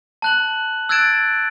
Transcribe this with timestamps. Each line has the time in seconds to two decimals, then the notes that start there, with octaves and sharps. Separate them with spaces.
0.22 A5 F#6 F#7
0.89 E6 F#6 G#6 A6 D7 E7